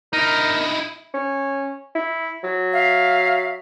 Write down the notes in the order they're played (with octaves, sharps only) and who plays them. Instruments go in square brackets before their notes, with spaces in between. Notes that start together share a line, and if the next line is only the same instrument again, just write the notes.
[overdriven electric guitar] D#4 E4 [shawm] A#4
[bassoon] C#4
E4
F#3
[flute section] E5 F5